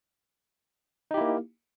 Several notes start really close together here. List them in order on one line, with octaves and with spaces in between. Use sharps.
D#4 G4 E4 A#3